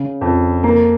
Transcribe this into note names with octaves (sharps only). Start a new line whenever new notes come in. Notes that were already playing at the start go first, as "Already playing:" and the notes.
Already playing: C#3
F2
A#3